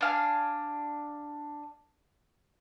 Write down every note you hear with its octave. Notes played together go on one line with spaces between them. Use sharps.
D4 F5 G#5